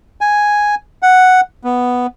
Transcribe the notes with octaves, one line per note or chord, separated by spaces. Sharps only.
G#5
F#5
B3